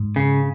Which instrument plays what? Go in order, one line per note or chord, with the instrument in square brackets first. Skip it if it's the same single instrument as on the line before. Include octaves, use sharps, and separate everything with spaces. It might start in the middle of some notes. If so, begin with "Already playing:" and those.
Already playing: [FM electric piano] G#2
[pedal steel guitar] C#3